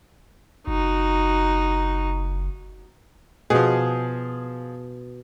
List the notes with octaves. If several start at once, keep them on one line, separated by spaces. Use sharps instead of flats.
F#1 D#4 F#4
B2 F3 G#4